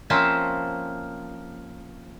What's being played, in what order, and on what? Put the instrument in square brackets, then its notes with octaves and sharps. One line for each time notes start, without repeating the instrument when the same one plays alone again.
[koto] F3 A#3 C4 C#4 E5 A5